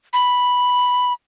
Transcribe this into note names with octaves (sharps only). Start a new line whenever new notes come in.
B5